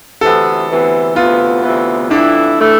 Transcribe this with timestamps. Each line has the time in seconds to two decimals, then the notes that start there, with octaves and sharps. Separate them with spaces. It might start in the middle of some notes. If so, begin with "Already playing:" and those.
0.21 D2 C3 E3 B3 A4
0.69 D2 C3 E3 B3
1.15 D2 C3 E3 B3 F4
1.63 D2 C3 E3 B3
2.10 F2 E3 A3 D4 E4
2.59 E3 A3 E4